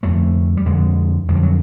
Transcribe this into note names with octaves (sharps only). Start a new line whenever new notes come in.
F2 D3 A3
G3
F2 D3 G#3
F2 D3 G3 G#3
F#3